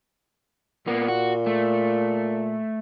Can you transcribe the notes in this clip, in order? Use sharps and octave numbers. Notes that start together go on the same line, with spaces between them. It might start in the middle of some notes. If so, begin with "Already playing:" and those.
A#2 A#3 B3
F#4
A3